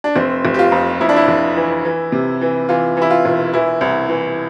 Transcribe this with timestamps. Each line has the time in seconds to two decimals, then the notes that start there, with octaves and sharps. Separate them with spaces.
0.04 D4
0.16 F1 C4
0.45 F1
0.54 G4
0.59 F4
0.72 F2
1.01 F2 E4
1.09 D4
1.16 E4
1.28 F1
1.56 E3
1.85 E3
2.12 C3
2.41 E3
2.69 E3 F4
2.97 E3 E4
3.10 F4
3.25 E1
3.53 E3 E4
3.81 C2
4.09 E3